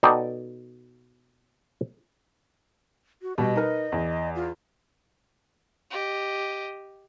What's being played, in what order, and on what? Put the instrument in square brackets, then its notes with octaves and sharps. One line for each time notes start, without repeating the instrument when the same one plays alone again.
[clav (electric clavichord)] B2 D#4 A4 D5 D#5 G5
[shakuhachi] F#4
[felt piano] B2 G3 [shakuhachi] D#5
[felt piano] D#4 A#4 B4
E2
[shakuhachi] F4
[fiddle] G4 D#5